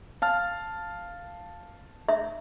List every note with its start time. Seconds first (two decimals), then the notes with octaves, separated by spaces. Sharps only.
0.22 F5 A5 F6
2.09 E5